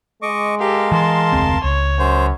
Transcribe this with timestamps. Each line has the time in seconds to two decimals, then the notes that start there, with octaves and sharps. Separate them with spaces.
0.22 G#3 D#5 C#6 D6
0.60 G4 A4 A#4 F5
0.92 E3 A5 C6
1.33 F1 D2 C4
1.64 C#2 C#5
1.99 F#2 C5